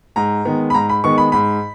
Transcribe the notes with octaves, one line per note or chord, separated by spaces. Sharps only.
G#2 A#5
D#3 G#3 B3
B5
G#2 A#5
B5
D#3 G#3 B3 C#6
B5
G#2 B5